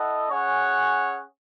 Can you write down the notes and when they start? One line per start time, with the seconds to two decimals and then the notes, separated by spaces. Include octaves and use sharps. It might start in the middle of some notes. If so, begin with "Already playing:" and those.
Already playing: E4 A4 D#5 F#5
0.29 C#4 G#4 C#5 F#5